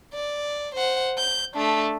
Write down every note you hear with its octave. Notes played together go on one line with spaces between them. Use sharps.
D5
C5 F#5
G6
A3 D4